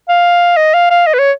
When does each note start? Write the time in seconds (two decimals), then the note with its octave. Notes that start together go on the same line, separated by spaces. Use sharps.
0.09 F5
0.57 D#5
0.74 F5
0.91 F5
1.07 D#5
1.14 B4
1.19 C#5